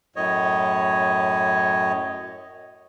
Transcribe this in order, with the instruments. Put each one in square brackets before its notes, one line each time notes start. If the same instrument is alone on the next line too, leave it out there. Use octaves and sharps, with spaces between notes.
[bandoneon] F#2 A2 C#5 D#5